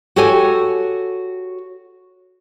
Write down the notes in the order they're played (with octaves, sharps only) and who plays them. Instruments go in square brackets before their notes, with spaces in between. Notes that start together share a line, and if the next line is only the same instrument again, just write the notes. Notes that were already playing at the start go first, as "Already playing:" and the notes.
[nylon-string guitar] F#4 G4 A4 C#5 G#5